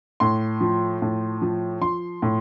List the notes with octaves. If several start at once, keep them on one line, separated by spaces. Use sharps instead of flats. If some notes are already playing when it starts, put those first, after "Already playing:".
A2 C6
F3
A2
F3
F3 C6
A2